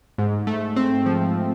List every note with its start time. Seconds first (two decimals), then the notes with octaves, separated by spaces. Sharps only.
0.18 G#2
0.47 A3
0.76 C4
1.06 F3